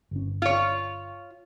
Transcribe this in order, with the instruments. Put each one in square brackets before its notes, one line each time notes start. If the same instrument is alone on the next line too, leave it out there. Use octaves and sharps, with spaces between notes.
[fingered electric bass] G1 C#4
[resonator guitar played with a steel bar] F4 C#5